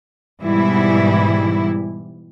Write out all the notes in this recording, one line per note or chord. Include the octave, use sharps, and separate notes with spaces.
G#2 B2 E3 G3 E4